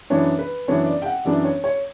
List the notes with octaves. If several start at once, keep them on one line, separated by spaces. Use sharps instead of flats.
F#2 E3 B3 D4 C#5
B4
F#2 E3 B3 D4 C#5
D5
G5
F#5
F#2 E3 B3 D4 D5
C#5
C#5